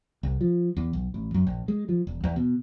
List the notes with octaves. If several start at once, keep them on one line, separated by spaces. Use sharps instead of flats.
C2
F3
E2
B1
A1
F#2
A#1
G#3
F3
E1
E2
B2